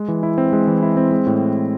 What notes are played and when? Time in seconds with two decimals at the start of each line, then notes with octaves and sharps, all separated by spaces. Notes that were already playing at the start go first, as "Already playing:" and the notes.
Already playing: G#3
0.08 E3
0.23 E4
0.38 C4
0.53 G#3
0.67 E3
0.82 E4
0.97 C4
1.12 G#3
1.27 A2